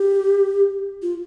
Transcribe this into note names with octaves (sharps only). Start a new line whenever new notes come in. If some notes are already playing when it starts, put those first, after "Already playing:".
Already playing: G4
F4